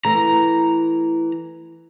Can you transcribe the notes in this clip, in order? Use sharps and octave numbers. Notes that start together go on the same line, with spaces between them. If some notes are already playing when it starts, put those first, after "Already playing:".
E3 A3 A#5